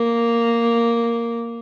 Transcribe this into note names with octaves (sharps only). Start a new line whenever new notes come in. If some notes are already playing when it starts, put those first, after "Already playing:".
Already playing: A#3